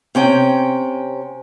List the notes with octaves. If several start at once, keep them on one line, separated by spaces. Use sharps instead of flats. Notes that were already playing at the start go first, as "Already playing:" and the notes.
C3 C#4 G5